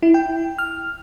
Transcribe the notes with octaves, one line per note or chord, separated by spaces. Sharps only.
E4
G5
F6